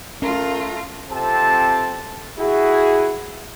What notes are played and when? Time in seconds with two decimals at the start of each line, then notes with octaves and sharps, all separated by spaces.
0.22 A3 C#4 F4 A#4 A#5
1.10 C3 C4 F4 A4 A5
2.39 E4 F#4 G#4